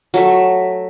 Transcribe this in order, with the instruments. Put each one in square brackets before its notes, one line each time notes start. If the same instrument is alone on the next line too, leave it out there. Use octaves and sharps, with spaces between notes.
[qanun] F#3 A3 E5